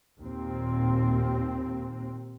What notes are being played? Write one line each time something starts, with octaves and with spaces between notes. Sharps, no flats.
D#2 A#2 C4